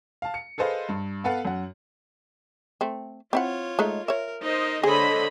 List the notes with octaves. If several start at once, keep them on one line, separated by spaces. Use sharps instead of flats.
F5 A5
C#7
G#4 A4 B4 C5 D#5 F5
G2
B3 A4 B4 F5 F#5
F#2 F#5
A3 C4
C4 E4 F4 C#5 F#5
G#3 A3 D#4
A#4 C#5 E5
D#4 A#4 C5 D#5
D3 G#4 C5 C#5 D#5 B5